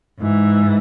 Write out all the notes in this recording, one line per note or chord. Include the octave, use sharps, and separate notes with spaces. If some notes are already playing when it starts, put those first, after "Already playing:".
G#2 E3